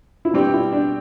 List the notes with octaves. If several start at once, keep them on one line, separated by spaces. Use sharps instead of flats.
E4
B2 G3 C4 D4 G4
E4
D4